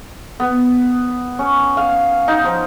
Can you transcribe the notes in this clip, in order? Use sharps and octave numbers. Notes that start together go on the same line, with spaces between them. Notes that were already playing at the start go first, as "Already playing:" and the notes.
B3
C#4
F5
D#4
F3